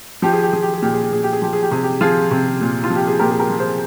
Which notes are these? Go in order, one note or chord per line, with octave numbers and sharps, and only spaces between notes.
F3 G4
G#4
G4
F3 G#4
G4
G#4
A#2 G4
G#4
G4
A#2 G#4
G4
G#4
F3 G4
G#4
G4
C3 G#4
G4
F3 F4 G#4
C3
A#2
F4
F3
G4
G#4
A#2 G4 A#4
G#4
G4 A#4
F3
G#4 C5